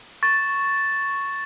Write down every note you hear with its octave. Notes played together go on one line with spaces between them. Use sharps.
C#6 A6